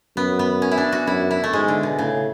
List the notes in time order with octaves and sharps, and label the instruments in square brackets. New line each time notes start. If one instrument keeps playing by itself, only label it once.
[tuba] F#2 [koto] B3
[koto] B3
C#4
E4
D4
F#4
[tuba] F#2 [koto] E4
[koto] E4
A3
[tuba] G#2 [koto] G#3
[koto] D3
B2
[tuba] A2 [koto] C#3